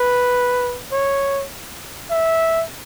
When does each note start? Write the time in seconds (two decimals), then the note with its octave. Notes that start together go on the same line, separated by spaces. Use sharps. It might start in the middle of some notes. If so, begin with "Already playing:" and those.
Already playing: B4
0.92 C#5
2.10 E5